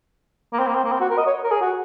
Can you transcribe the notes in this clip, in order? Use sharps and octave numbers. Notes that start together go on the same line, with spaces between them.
A#3
C4
A#3
C4
A#3
C4
F#4
A#4
D#5
C#5
A#4
G#4
F#4